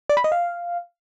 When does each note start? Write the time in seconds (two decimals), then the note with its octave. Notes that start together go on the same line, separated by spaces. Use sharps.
0.09 D5
0.17 B5
0.24 D#5
0.32 F5